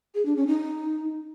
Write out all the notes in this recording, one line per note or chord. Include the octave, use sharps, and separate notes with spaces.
G#4
D4
C#4
D#4